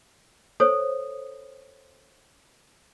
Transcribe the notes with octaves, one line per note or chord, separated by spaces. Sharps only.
A4 C5 C#5 D#6